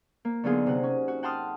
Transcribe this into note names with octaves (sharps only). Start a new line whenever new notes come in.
A#3
D3 F#3 B3 D#4 F4 G#4
C3 F#5
C#4
F#4
F#5 G5 A5 C6 D#6 F6